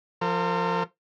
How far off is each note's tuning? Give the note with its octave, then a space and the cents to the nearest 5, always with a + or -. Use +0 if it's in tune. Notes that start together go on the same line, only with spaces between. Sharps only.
F3 +0 A#4 -40